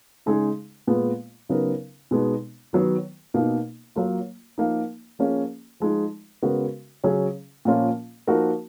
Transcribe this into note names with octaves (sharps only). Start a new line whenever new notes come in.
C#3 G#3 D#4 G#4
A#2 G#3 B3
C#3 F#3 B3 D#4 A#4
B2 G#3 B3 D#4
D#3 F#3 B3
B2 A#3 D#4
F#3 A#3 F4
F3 A#3 D#4
F3 A#3 C#4 G#4
F3 G#3 D#4
C#3 G#3 B3 F#4 A#4
C#3 F#3 C#4 G#4
A#2 F3 A#3 C#4 F4
F3 A#3 D#4 F#4 A#4